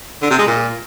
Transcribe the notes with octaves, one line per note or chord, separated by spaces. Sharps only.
D3
C3
G#3
A#2